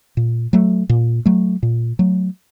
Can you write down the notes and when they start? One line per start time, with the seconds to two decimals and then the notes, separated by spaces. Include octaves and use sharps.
0.17 A#2
0.53 F#3 A3
0.89 A#2
1.26 F#3 A3
1.63 A#2
1.99 F#3 A3